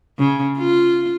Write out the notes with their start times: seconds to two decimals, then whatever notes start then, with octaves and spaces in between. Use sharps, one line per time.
0.19 C#3
0.59 F4